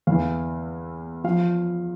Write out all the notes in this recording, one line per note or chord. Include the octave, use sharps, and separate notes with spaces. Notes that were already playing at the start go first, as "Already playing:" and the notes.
E2 E3 F5
F3 F5